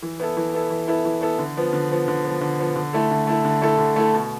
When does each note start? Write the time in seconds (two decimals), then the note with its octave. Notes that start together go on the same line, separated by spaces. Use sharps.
0.02 E3
0.20 B3 E4 A4
0.37 E3
0.54 B3 E4 A4
0.70 E3
0.88 B3 E4 A4
1.05 E3
1.21 B3 E4 A4
1.39 D3
1.57 F3 B3
1.73 D3
1.90 F3 B3
2.08 D3
2.25 F3 B3
2.41 D3
2.59 F3 B3
2.76 D3
2.93 A3 E4 A4
3.11 D3
3.27 A3 E4 A4
3.44 D3
3.62 A3 E4 A4
3.78 D3
3.96 A3 E4 A4
4.14 B2